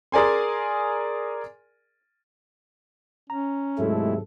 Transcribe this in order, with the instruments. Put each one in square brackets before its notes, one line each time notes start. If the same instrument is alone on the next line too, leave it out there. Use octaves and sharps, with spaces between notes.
[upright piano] G#4 A#4 D5 G#5 C6
[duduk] C#4 [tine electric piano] A#5
[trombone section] D#2 C3 A4 [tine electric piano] G#2 F#3 [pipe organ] G#3 A3 E4